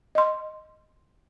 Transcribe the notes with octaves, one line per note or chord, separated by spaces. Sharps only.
D#5 C6